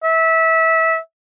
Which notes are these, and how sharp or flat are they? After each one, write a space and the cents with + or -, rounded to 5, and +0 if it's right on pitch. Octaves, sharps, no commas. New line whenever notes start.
E5 -20